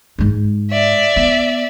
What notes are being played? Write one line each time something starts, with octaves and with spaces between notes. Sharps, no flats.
G#2 G#3
D5 E5
B3